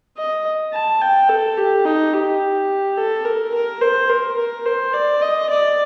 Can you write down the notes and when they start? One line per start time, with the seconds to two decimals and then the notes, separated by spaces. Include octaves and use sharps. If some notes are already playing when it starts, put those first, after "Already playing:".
0.17 D#5
0.73 A5
1.01 G5
1.29 A4
1.57 G4
1.85 D#4
2.13 G4
2.98 A4
3.25 A#4
3.54 A#4
3.81 C5
4.09 A#4
4.38 A#4
4.65 C5
4.93 D5
5.21 D#5
5.50 D5